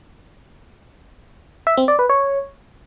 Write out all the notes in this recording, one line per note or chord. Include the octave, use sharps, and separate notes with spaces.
E5
C4
D5
B4
C#5